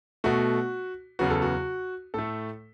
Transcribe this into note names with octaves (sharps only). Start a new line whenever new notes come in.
B2 A3 F#4
E2 C#3 F#3 B3 F#4
A4
F#4
A2 A3 A4